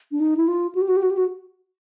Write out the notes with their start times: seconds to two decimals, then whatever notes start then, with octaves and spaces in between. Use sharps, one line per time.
0.12 D4
0.20 D#4
0.37 E4
0.48 F4
0.75 F#4
0.81 G4
0.89 F#4
0.97 G4
1.03 F#4
1.11 G4
1.17 F#4